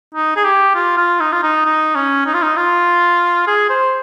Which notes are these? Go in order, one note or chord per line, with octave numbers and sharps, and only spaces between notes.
D#4
G#4
G4
F4
F4
D#4
F4
D#4
D#4
C#4
D#4
F4
D#4
F4
G#4
C5